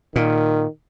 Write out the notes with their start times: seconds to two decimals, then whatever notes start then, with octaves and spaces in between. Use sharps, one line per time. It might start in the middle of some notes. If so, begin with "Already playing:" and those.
0.16 A#2 D#3